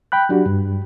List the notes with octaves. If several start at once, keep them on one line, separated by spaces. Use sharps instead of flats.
G5 B5 F#6
F#3 D4 F#4 G4
G2